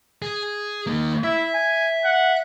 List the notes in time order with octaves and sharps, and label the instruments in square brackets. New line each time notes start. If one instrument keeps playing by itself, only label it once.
[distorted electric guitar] G#4
D#3 A#3
[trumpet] E4 [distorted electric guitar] E5
[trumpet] G#5
F#5